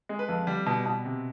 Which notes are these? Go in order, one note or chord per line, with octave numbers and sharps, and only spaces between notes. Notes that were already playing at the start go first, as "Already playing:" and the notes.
G#3
B4
F2
G3
B2
B2
C3